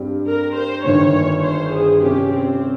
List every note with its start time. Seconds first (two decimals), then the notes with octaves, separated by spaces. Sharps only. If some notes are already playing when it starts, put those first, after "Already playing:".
Already playing: G2 G3 C4 G4
0.26 A#4
0.54 C5
0.84 G1 G2 D#3 A#3 C#5
1.42 C5
1.71 G#4
2.01 C3 G3 C#4 G4
2.31 C4